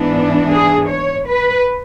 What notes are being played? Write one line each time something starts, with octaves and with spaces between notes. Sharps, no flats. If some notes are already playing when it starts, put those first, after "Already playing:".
Already playing: G#2 E3 B3 D4
G#4
C#5
B4